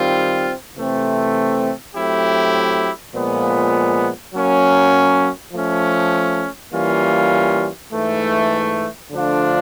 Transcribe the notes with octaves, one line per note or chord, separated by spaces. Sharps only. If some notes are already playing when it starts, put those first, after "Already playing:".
Already playing: D#3 G3 C4 F4
C3 E3 A3 C4
F#3 A3 C4 E4 G4
A#2 F3 G#3 B3
F#3 A#3 C#4
F3 A3 C#4
E3 G3 A#3 C#4 F4
G#2 E3 A3
D3 F3 A3 D4 F4